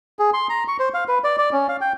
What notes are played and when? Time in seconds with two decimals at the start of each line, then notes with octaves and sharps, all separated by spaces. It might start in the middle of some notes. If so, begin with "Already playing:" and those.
0.19 G#4
0.34 C6
0.50 A#5
0.68 C#6
0.79 C5
0.94 F5
1.08 B4
1.24 D5
1.38 D5
1.52 C#4
1.69 F5
1.81 G5